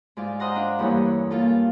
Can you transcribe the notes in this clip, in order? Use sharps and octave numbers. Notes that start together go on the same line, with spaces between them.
G#2 F4 D5
C5 D#5 F5 F#5 A#5 C6
D4
E2 G2 A#3 E4 C#5
A#3 F4 A4